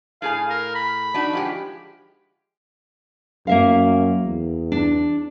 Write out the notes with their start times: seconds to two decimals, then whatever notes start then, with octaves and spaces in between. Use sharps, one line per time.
0.22 A2 G#4 F5 G#5
0.50 A#4
0.75 B5
1.14 D4 D#4 F#4
1.33 F3 G#3 G4
3.47 F#2 A#3 E5 F5
4.25 E2
4.72 D4